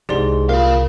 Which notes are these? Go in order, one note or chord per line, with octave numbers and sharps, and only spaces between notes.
C2 G#2 G4 D5 C6
A#2 G#4 A#4 F5